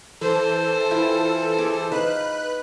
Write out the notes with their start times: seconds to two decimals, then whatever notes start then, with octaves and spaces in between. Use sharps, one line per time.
0.21 E3 A4 C5
0.91 E4 F4 G5
1.58 G#4 D6
1.92 D#4 B4 F5 F#6